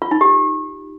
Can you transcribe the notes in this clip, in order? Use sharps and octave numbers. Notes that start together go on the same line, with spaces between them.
F4
D#4
G4